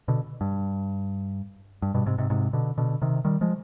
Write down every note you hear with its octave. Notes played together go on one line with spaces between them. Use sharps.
B2 D3
G2
G2
G2 B2
G#2 C3
G#2 C3
G#2 C3
B2 D3
B2 D3
C3 D#3
D#3 G3
F3 G#3